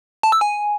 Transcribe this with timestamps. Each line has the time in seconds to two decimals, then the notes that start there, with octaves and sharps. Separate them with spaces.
0.23 A5
0.32 E6
0.41 G#5